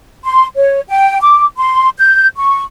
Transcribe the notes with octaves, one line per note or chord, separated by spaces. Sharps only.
C6
C#5
G5
D6
C6
G6
C#6